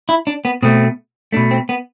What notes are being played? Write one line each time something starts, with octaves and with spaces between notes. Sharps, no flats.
E4
D4
B3
B2 A3 C4
B2 A3 D4
C4
B3